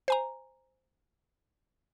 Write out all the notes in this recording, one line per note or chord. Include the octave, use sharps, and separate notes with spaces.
C5 G#5 A#5